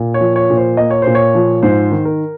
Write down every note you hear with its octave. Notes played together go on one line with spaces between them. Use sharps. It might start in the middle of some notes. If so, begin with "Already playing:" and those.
Already playing: A#2
C#5
F3
C#5
A#2
C5
A#3 D#5
C#5
A#2 C5
C#5
F3
G#2 C5
D#3
A#4